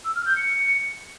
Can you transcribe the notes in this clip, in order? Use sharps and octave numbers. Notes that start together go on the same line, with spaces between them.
E6
F6
G6
C#7